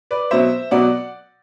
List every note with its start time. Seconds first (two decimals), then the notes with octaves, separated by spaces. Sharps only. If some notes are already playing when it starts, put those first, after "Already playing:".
0.11 B4 D5
0.31 B2 F#3 C5 E5
0.71 B2 F#3 D5 F#5